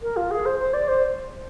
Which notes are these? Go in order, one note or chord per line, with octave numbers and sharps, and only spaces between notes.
A#4
F4
G#4
C5
C5
D5
C5